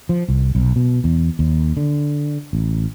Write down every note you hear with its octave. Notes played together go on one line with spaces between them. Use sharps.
F3
C2
B1
B2
E2
D#2
D3
A1